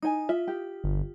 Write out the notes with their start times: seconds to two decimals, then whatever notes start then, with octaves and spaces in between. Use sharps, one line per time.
0.02 D#4 G#5 D#6
0.29 F4 E5
0.48 G4
0.84 G1